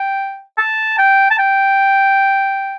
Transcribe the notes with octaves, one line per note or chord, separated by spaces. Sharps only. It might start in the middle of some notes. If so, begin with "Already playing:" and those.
Already playing: G5
A5
G5
A5
G5